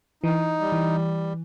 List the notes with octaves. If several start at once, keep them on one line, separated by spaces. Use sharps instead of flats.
E3 D#4
G3
E3